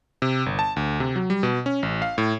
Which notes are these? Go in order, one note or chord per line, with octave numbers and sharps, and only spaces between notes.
C3
G1
A5
D2
C3
F#3
G3
B2
C#4
A1
F5
A2